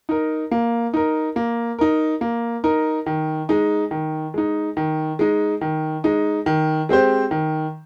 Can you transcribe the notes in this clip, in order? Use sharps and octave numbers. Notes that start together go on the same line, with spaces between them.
D#4 A#4
A#3
D#4 A#4
A#3
D#4 A#4
A#3
D#4 A#4
D#3
G#3 D#4
D#3
G#3 D#4
D#3
G#3 D#4
D#3
G#3 D#4
D#3
G#3 C4 G4 C5
D#3